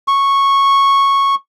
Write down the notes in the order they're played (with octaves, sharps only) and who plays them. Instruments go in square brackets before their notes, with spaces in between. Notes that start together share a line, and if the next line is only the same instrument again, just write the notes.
[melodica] C#6